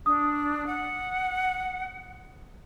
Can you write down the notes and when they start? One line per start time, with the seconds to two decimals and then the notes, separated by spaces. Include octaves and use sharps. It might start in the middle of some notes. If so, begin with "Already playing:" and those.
0.06 D4 D#6
0.67 F#5